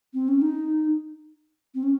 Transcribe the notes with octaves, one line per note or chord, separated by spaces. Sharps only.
C4
C#4
D#4
C4
C#4